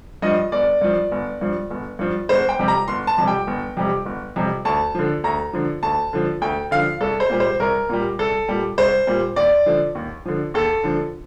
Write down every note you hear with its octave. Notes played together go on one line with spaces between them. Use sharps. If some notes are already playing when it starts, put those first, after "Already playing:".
G2 F3 D#5
G1 D5
G2 F3
G1
G2 F3
G1
G2 F3
G1 C5
G5
F2 C3 G3
A#5
G1 C6
A5
F2 C3 G3
G5
G1
F2 C3 G3
G1
F2 C3 G3
D2 A5
D3 F3
D2 A#5
D3 F3
D2 A5
D3 F3
D2 G5
D3 F3 F5
C2 A4
C5
A#2 G3
C5
C2 A#4
A#2 G3
C2 A4
A#2 G3
C2 C5
A#2 G3
D#2 D5
D3 F3
D#2
D3 F3
D#2 A4
D3 F3